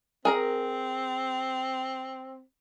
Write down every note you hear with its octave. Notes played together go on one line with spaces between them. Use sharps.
C4 G#4 A#4 A#5